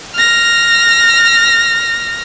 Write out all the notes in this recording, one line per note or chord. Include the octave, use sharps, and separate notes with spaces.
F6 A#6